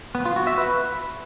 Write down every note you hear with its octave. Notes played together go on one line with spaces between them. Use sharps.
B3
F4
F#4
E5
B4